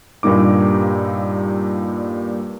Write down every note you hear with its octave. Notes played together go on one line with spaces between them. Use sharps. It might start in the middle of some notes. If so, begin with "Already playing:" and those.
G2 A#2 G3 A#3 D#4 D6